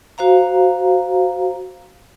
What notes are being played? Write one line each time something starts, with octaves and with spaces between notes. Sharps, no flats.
F#4 C5 F5 A#5